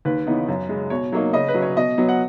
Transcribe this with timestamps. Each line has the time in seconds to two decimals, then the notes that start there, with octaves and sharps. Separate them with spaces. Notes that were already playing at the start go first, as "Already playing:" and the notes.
0.05 D#2 B4
0.26 C#3 E3 B3 D#4
0.49 F#2
0.69 C#3 G#3
0.90 B2 C#5
1.12 F#3 A#3 D#4 C#5
1.33 C#3 D#5
1.48 B4
1.54 F#3 C#4
1.62 C#5
1.77 B2 D#5
1.98 F#3 B3
2.09 F#5